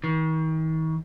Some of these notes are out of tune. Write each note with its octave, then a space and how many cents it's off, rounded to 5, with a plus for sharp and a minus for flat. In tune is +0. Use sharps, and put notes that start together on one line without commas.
D#3 +40